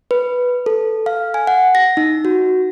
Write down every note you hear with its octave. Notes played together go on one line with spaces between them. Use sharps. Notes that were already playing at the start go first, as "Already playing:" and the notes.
B4
A4
F5
G#5
F#5
A#6
D#4
F#4